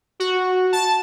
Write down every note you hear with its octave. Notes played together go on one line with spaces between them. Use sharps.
F#4
A5